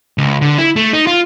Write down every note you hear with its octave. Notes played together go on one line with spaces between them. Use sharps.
C#2
D3
E4
A3
D#4
F4